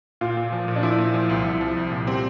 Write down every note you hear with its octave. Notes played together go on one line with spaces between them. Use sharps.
A#2 F4
A#2
F3
A#2
D4
F3 E4
A#2
F3 E4
C2
C2 E4
F3
C2
A#2
G3 C4